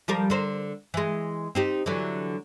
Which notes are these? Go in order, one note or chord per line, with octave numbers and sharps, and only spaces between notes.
F3 G3 A#4
D3 A#4 C5
E3 G#3
C4 D#4 G4
D3 E3 F#3